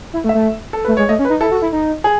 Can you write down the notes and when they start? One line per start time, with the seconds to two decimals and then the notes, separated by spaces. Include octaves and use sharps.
0.13 E4
0.24 A3
0.29 E5
0.35 A3
0.73 A4
0.85 A3 B4
0.97 G#3 C#5
1.09 A3 D#5
1.19 C#4
1.25 B4
1.30 D#4
1.41 E4 A4
1.51 F#4
1.62 E4
1.73 D#4
2.04 G#4